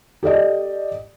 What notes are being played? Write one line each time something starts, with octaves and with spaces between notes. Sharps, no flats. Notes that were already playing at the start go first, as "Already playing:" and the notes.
G4 A4 D5 D#5